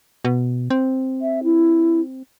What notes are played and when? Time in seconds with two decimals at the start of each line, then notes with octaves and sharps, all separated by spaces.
0.25 B2
0.70 C4
1.22 E5
1.44 E4